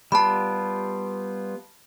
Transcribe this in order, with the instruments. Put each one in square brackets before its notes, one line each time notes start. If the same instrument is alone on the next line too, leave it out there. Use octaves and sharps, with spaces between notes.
[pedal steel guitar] G3 B3 F4 [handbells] A5 B5